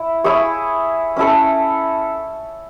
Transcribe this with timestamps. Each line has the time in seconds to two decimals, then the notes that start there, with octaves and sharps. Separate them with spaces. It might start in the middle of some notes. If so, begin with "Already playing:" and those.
Already playing: E4
0.24 E4 G#4 C#5
1.17 C#4 E4 A4